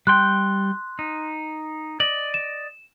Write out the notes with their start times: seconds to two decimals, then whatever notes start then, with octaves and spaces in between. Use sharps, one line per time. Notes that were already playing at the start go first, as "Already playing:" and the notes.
0.07 G3 G5 C6 F#6
0.99 D#4
2.00 D5 D#5 F#7
2.34 E7